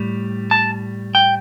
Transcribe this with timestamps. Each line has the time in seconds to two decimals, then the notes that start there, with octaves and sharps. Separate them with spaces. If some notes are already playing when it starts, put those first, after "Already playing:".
Already playing: A2 G3
0.51 A5
1.15 G5